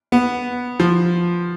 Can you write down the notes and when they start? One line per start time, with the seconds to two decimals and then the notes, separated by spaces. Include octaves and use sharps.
0.12 B3
0.80 F3